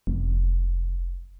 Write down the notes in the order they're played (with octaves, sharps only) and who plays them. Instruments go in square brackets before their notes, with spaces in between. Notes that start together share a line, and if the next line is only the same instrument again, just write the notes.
[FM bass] F1